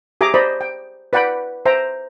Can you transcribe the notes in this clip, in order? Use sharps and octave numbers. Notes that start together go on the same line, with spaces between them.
G4 G#4 E5 A#5 D6
C5 D5 D#5 B5
G5
B4 D5 F#5 G5 B5
C5 E5 G5 A#5